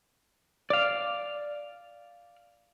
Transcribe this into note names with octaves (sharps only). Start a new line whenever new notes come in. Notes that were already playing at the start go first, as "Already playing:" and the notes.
D5 F5